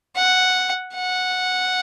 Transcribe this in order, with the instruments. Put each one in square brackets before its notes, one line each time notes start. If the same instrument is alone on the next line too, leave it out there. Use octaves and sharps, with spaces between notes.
[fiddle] F#5
F#5